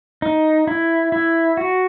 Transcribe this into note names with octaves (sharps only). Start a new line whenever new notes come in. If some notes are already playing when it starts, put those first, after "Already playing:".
D#4
E4
E4
F#4